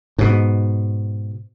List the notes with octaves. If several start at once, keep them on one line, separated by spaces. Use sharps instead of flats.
G#2 B2